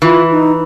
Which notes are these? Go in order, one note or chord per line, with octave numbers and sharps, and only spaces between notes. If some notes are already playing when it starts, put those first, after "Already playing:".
E3 F4
D#4